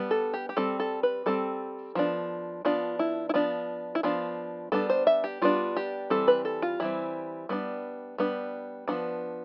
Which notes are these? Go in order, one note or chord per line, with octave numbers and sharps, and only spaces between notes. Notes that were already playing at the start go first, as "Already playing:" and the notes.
Already playing: G3 B3 D4
A4
G4
G4
G3 C4 A4
A4
B4
G3 C4 A4
F3 B3 D4
F3 B3 D4 F4
E4
E4
F3 B3 D4 F4
E4
F3 B3 D4 F4
G3 B3 D4 A4
C5
E5
G4
G3 B3 D4 F4
G4
E3 G3 C4 A4
B4
A4
F4
E3 G3 C4 E4
G3 B3 D4
G3 B3 D4
F3 B3 D4